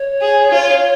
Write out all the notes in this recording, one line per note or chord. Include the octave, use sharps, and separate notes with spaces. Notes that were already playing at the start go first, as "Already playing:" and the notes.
Already playing: C#5
G#4
F4